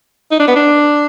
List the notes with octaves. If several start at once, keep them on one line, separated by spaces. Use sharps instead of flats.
D#4
D4
B3
D4